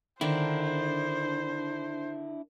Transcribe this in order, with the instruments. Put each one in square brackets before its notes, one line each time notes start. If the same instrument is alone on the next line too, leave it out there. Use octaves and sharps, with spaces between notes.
[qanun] D3 D#3 [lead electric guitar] D4 E4 [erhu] C5